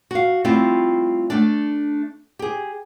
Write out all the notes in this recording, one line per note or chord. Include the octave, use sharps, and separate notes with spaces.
F#4 F5
G3 A3 C4 E4 F4
A3 D4
G4 G#4